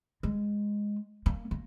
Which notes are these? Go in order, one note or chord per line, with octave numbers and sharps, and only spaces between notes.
G#3
A#3
A#3